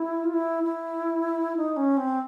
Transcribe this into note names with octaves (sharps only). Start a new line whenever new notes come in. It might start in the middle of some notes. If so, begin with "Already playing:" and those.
Already playing: E4
F4
E4
E4
D#4
C#4
C4